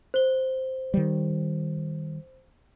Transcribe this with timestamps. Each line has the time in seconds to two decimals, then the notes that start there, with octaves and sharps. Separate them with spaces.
0.14 C5 G7
0.94 D#3 G3